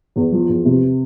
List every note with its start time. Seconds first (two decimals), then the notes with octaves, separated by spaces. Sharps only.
0.16 E2
0.32 F3
0.49 E2
0.65 C3